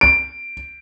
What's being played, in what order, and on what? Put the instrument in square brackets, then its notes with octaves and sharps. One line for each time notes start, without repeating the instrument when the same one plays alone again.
[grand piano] D7